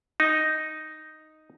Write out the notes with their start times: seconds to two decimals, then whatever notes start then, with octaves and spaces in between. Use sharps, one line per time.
0.20 D#4